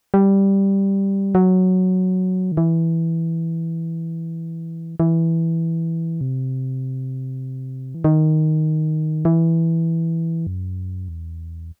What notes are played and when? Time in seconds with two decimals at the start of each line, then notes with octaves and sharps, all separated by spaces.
0.14 G3
1.35 F#3
2.52 D#3
2.57 E3
5.00 E3
6.21 C3
7.95 E3
8.04 D#3
9.25 E3
10.47 F#2
11.08 E2